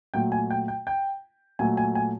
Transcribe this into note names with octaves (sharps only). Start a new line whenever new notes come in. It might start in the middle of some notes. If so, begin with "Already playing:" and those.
A#2 F#3 A3 G5
G#5
G5
G5
G5
A#2 F#3 A3 G#5
G#5
G#5